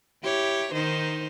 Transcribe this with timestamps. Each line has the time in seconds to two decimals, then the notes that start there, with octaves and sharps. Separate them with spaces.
0.23 E4 G4 C#5
0.73 D#3 D#4 C5